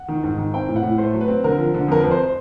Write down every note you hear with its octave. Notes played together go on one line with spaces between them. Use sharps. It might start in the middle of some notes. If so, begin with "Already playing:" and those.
Already playing: F#5
D#3
G#2
D#3
C4 G5
A2
F#5
A2
A3 C5
F#3
B4
C4
D3 A#4
F3
D3
F2 A#4
F2 B4
C5
C5